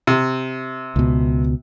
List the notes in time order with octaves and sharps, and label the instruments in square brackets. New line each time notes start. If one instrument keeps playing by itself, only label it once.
[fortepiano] C3
[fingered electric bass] C#2 B2